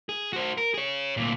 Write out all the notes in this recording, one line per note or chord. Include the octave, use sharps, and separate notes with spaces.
G#4
F#4 C5
A#4
G#4 C#5
D2 A#2